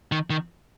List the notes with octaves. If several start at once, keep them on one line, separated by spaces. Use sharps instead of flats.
D#3
D#3